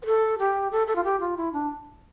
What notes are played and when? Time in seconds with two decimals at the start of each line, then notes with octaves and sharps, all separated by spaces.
0.03 B4
0.06 A4
0.39 G4
0.72 A4
0.87 A4
0.96 F4
1.04 G4
1.20 F4
1.37 E4
1.53 D4